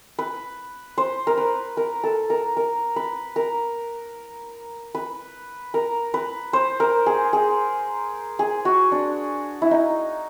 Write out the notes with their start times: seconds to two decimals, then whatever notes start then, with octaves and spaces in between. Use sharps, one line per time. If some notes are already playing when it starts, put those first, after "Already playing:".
0.19 B4
0.98 C5
1.27 A#4
1.37 B4
1.77 A#4
2.04 A4
2.30 A#4
2.57 A#4
2.96 B4
3.36 A#4
4.95 B4
5.74 A#4
6.14 B4
6.53 C5
6.80 A#4
7.06 G#4
7.33 G#4
8.39 G#4
8.65 F#4
8.92 D4
9.62 E4
9.71 D#4